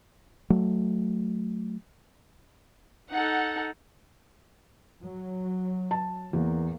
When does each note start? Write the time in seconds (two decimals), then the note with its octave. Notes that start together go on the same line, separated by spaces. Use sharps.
0.50 F#3 A3
3.12 D#4 A4 F#5
5.01 F#3
5.91 A5
6.33 E2 A#3